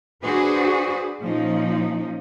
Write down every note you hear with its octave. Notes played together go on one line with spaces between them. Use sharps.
D4 F#4 G#4 B4 C5
A#2 F3 C#4 D#4